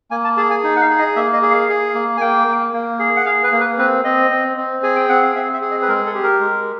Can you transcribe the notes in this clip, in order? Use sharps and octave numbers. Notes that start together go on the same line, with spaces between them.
A#3 G#5
A5
G#4 A5
G#5
D#4
F#5
F5
G#4
D#5
A#3 E5
D#5
G#4
F5
G#4
A#3
G#5
A#3 G5
A#3
A#3
G#4
F#5
G#4 F5
B4
A#3
B4
C4 B4
C4 D#5
C4
C4
G#4 G#5
G5
C4 F#5
F5
C4 E5
E5
G#4
D#5
B4
G#3 A#4
A4
G4
A#4
G#3